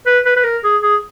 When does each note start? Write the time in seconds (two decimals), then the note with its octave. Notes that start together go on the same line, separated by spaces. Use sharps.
0.06 B4
0.25 B4
0.36 B4
0.44 A#4
0.64 G#4
0.82 G#4